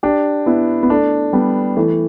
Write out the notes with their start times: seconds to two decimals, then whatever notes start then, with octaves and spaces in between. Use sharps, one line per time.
0.03 D4 G4
0.46 B3 E4
0.83 B3
0.90 A3 D4
1.33 G3 B3
1.76 E3 A3